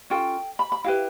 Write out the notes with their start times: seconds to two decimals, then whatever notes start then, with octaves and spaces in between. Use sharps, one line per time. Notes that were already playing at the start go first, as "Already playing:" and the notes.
0.10 C#4 F4 A4 G5
0.59 B5
0.72 B5
0.84 E4 G4 B4 F5